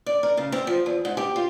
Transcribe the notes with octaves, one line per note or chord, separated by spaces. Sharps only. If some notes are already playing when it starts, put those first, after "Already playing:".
D5
A#4
C#3
C4
F3
E2
G#2
G4
F4